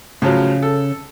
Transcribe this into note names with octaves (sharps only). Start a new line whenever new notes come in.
A2 C#3 F3 F#3
A4